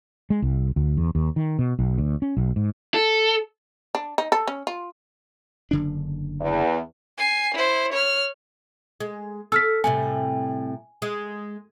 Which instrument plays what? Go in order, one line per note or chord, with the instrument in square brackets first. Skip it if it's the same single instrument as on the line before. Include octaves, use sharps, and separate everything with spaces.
[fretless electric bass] G#3
C2
D2
E2
D#2
D#3
B2
B1
D2
C#4
B1
G#2
[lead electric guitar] A4
[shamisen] D4
D#4
A4
C#4
F4
[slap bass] F#1 D3 D4
[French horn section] E2
[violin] G#5 C7
E4 C5
C#5 F6
[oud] G#3
[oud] A4 [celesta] E6 F6 B6
[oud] A2 C3 G3 [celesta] G#5
[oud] G#3